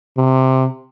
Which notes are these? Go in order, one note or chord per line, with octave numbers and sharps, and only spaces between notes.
C3